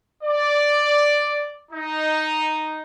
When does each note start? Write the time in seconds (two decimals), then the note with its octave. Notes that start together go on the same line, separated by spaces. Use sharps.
0.23 D5
1.72 D#4